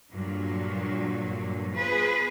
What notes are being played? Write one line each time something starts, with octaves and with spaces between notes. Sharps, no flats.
G2 A#2 D3 F#3
B3 F4 G#4 B4 C5